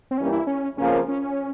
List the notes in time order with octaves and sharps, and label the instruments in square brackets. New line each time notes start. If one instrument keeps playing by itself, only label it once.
[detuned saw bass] C4
[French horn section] G2 E3 G3 A#3 [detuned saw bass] C#4
[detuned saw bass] E4
C#4
[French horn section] F2 C#3 F3 A#3 [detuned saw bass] C#4
[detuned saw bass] C#4